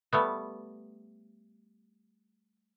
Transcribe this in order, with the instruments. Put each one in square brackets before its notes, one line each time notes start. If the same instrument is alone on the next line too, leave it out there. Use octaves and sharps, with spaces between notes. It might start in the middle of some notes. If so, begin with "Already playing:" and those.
[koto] G3 A3 B3